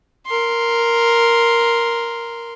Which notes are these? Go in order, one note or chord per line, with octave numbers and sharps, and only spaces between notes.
A#4 C6